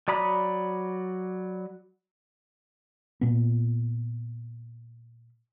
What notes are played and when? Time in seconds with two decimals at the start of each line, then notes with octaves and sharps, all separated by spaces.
0.08 F#3 D5 A#5 B5 D#6
3.21 A#2 B3